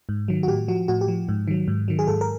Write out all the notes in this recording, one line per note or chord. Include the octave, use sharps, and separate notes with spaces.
G#2
D#3 F#3
F#4
A2 G4
F3 F#4
A2 F#4
G4
F3
G#2
D#3 F#3
G#2
D#3 F#3
G#4
G#2 A4
A#4